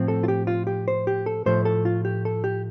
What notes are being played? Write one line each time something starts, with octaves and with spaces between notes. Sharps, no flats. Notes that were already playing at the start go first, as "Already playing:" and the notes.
Already playing: A2 F3 C4
A4
F4
G4
F4
G4
C5
G4
A4
A2 F3 A3 C5
A4
F4
G4
A4
G4